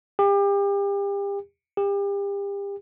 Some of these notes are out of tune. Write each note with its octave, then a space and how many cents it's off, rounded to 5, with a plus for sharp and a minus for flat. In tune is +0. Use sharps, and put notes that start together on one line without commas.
G4 +35
G4 +35